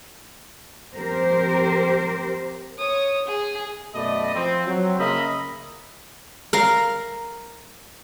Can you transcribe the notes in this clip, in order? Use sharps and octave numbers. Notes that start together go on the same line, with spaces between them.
F3 C4 G4 A#4 C5
C#5 D#6
G#4
F#2 B2 A3 D5 D#5 B5
F3 C4
F#3 C4
C#3 A#3 A#4 D#5 E5 B5
A#4 F5